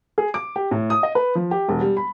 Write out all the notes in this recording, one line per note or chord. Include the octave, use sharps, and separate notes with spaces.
G#4
D6
G4
A2
D#6
D#5
B4
F3
G4
E1
G3
B5